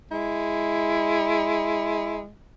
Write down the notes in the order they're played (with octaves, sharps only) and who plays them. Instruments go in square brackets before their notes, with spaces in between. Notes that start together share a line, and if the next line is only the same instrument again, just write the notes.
[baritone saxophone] G#3 [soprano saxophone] E4